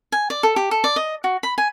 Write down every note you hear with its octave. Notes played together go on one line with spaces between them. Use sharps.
G#5
D5
A4
G4
A4
D5
D#5
F#4
B5
G#5